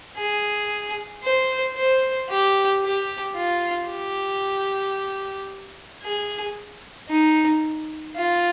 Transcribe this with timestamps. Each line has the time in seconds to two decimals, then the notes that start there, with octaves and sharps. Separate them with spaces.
0.17 G#4
1.23 C5
1.76 C5
2.30 G4
2.82 G4
3.36 F4
3.89 G4
6.03 G#4
7.09 D#4
8.16 F4